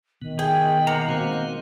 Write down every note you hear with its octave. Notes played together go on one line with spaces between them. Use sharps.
B2 D#3 B3
G#4 G5
A#3 C5 F#5 A#5
G#3 C4 F#4
D#5